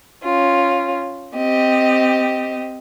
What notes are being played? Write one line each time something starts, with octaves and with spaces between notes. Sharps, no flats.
C#4 F4
C4 G4 D#5